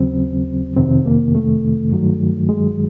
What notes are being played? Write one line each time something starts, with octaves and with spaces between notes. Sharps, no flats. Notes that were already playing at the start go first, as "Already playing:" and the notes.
Already playing: D#2 C#3 F#3 C4
F2 C3 D#3 C4
A#3
A3
G2 D#3 F#3
G#3